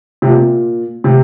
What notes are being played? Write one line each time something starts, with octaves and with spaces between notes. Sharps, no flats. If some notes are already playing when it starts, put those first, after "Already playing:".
C3
A#2
C3